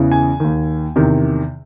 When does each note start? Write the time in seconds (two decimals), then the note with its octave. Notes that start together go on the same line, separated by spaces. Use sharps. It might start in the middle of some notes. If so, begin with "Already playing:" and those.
Already playing: E2 C#3 E3
0.12 G#5
0.40 D#2 D#3
0.96 E2 C3 D#3